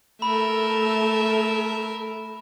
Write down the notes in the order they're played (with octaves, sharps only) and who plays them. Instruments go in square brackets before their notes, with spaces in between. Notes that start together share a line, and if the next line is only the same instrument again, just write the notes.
[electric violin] A3 A4 [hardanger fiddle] A#4 E5 [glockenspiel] B5